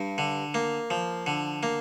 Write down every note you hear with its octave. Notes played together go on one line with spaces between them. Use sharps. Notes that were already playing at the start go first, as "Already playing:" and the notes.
Already playing: G2
D3
A#3
F3
D3
A#3